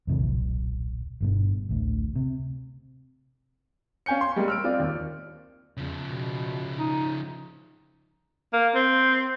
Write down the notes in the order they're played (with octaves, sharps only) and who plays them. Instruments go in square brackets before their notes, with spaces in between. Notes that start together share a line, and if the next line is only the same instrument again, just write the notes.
[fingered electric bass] F2 C3 E3
D#1 B1
G1 G2 B2
A1 D2
C3
[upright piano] C#4 F5 G#5 G6 C#7
C6
G3 G#3 A#3
E6 F6 D7
C4 F4 D5
D#2
[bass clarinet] E2 [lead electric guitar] C#3 F3
[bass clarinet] B2
D#4
[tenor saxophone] A#3
C4